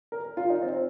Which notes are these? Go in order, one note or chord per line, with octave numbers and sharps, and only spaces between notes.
A#4
F4
D#4
C4